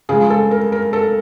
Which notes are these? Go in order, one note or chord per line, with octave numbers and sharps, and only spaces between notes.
C#3 F3 G#3 G#4
A4
A#4
A#4
A4